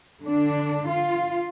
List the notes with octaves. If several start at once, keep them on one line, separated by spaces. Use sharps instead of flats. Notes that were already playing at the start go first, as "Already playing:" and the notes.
D3 D4
F4